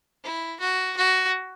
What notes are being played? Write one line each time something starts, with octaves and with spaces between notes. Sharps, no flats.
E4
F#4
F#4